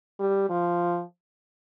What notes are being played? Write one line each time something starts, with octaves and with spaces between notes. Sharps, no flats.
G3
F3